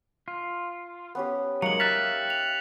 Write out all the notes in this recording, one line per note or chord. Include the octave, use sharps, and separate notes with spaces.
F4
B3 C#4 G4
F#3 G#3 A#3 D#4 C#7 F#7
G4 E5 F5 F#6 A6 B6
F7